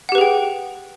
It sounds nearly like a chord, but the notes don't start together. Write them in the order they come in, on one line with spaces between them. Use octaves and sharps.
F#5 G4 B4 G#4 G5